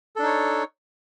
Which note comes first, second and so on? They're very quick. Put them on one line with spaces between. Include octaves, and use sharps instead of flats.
A4 D4 D#4 C#5